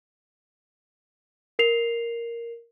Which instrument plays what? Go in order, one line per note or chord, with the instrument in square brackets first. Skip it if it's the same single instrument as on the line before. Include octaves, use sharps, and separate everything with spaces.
[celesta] A#4 C7 F7